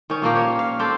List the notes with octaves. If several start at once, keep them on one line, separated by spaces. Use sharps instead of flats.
D#3 C#4
A#2 F3 A#3 G4
A#4 C#5
F5
C4 G4 A4